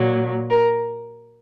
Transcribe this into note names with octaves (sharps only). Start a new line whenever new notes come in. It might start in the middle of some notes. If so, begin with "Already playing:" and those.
Already playing: A#2 F#3
A#4